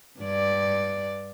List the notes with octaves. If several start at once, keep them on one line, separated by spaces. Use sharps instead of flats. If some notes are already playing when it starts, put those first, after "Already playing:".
G2 D5